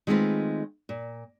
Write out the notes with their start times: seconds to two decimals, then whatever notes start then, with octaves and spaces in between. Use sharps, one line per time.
0.07 D#3 G#3 A3 C4 F4 B4
0.89 A#2